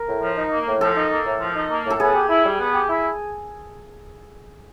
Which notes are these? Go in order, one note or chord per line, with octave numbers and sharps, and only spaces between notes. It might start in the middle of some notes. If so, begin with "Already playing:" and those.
Already playing: A#4
A2
F3
D#4
A#3
A2
F3 A4
D#4
A#3
A2
F3
D#4
A#3
A2 A4
B3 G#4
G4
E4
G3
B3
G4
E4